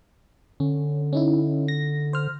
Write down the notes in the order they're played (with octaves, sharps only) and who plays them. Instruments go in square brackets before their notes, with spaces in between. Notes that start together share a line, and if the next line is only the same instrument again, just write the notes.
[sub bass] D3 [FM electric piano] C#4
[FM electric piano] C#4 D#4 E4
A#6
C5 F6